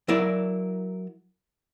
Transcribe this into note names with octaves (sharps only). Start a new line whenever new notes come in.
F#3 E4 A#4 D5